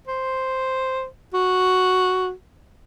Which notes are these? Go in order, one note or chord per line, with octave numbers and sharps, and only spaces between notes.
C5
F#4